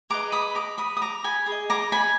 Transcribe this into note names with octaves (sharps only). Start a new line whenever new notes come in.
G#4 B4 D#5 A#5 D6
B5 D#6
A#5 D6
B5 D#6
D#6
A#5 D6
G#5 B5
G#4
D#5
A#5 D6
G#5 B5